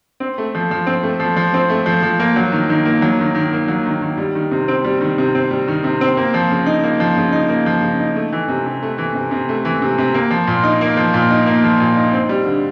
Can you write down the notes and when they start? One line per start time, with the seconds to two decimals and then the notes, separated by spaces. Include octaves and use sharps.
0.20 C4
0.38 A3
0.55 F3
0.71 F3
0.87 C4
1.03 A3
1.20 F3
1.37 F3
1.54 C4
1.70 A3
1.86 F3
2.03 F3
2.20 A#3
2.36 F#3
2.52 D#3
2.69 D#3
2.85 A#3
3.02 F#3
3.20 D#3
3.35 D#3
3.53 A#3
3.68 F#3
3.86 D#3
4.02 D#3
4.18 G3
4.35 D#3
4.51 C3
4.68 C4
4.85 G3
5.01 D#3
5.18 C3
5.35 C4
5.51 G3
5.68 D#3
5.84 C3
6.01 C4
6.17 A#3
6.34 F3
6.51 C#3
6.66 D#4
6.84 A#3
7.00 F3
7.17 C#3
7.32 D#4
7.49 A#3
7.66 F3
7.82 C#3
8.00 D#4
8.16 A3
8.32 E3
8.48 C3
8.66 C3
8.83 A3
8.98 E3
9.15 C3
9.31 C3
9.49 A3
9.65 E3
9.82 C3
9.98 C3
10.14 A#3
10.30 F3
10.47 A#2
10.64 D#4
10.81 A#3
10.97 F3
11.14 A#2
11.30 D#4
11.47 A#3
11.64 F3
11.80 A#2
11.96 D#4
12.13 C4
12.29 G3
12.46 D3